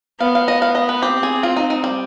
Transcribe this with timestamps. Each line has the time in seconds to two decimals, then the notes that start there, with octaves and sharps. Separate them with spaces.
0.20 B3 F5
0.35 F5
0.48 D#5
0.62 F5
0.75 D#5
0.89 B4
1.02 C4 G4
1.23 G#4
1.43 F4
1.57 D#4
1.70 D#4
1.84 G3